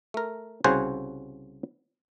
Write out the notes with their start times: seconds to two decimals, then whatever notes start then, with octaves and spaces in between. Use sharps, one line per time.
0.14 A3 A#4
0.64 C2 C#3 F#4 C5 F#5 G#5